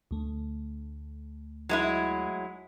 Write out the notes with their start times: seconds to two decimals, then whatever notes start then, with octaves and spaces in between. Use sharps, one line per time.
0.11 D2 A3
1.69 F#3 G#3 E4